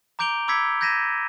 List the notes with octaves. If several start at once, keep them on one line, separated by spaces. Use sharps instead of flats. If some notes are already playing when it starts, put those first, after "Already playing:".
A#5 D6 G6 D7 F7 G7
B5 D6 E6 G#6 B6 C#7
G6 G#6 A#6 B6 D#7 E7